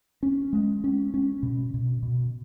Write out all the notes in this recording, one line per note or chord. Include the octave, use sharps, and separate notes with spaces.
C#4
G#3
C#4
C#4
B2
B2
B2